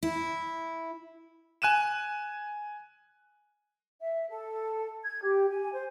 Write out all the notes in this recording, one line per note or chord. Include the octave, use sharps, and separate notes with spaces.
E4
G#5 F#6 D#7 E7
E5
A4
G#6
G4
G#5
C5